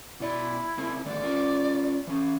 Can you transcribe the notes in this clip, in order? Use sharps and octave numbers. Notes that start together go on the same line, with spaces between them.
B2 E4 D5
C#3 C4 A#4
A2 D3 D#3 D5
C#4 F4 A#4
E3 C#4